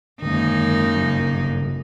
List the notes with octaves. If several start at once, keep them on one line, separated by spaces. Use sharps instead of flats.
F#2 D3 D#3 G#3 A#3 D#4
G2 C#3 F#3